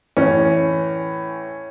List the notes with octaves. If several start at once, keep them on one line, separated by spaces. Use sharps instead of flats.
A2 E3 C#4